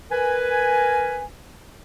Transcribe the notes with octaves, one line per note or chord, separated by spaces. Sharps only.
A#4 B4 G#5